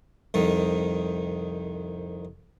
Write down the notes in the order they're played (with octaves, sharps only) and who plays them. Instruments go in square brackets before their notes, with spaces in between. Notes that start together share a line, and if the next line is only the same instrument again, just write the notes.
[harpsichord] C2 F2 D#3